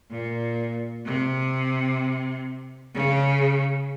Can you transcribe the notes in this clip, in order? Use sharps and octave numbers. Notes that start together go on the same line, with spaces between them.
A#2
C3
C#3